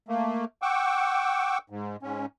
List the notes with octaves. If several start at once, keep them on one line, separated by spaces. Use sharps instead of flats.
A3 A#3
F#5 G5 C#6 D6 E6
G#2
G#2 C#4